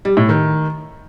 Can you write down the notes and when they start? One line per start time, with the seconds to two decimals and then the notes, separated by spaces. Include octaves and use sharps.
0.05 G3
0.17 A2
0.29 D#3